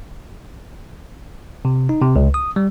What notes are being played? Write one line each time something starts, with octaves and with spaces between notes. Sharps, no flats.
C3
D#4
C3
C#2
D#6
G3